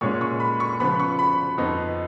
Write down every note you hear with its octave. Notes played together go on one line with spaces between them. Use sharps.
A#2 G#3 C#4 C#6
C#6
B5
C#6
C#3 F3 B3 B5
C#6
B5
F2 F3 B3 D#4